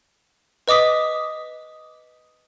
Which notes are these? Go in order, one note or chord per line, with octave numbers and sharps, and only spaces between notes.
B4 D#5 D6 D#6 B6